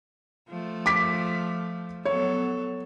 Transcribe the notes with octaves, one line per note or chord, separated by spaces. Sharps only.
F3 A3
D6 B6
F#3 B3 A4 C#5